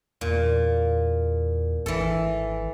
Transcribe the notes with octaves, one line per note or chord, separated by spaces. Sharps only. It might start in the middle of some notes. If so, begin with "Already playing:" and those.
E2 A#2
G#1 E3 A4